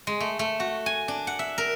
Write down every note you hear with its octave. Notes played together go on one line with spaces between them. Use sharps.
G#3
A3
A3
F#4
G#5
D4
F#5
E5
A#4